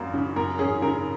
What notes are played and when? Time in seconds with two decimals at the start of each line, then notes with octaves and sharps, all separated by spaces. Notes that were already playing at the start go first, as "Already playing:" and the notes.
Already playing: G#1 F#2 A#3
0.14 C#3
0.36 F#2 A#4
0.59 C#4 G#4
0.82 C#3 A#4